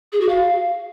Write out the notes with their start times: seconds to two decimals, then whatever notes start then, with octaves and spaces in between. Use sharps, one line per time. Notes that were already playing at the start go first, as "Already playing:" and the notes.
0.13 G#4
0.21 F#4
0.29 F5